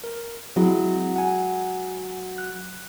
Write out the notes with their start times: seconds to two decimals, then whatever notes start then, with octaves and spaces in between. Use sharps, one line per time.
0.04 A#4
0.56 F#3 G#3 C4 E4 F#4
1.16 F#5 G#5
2.38 F#6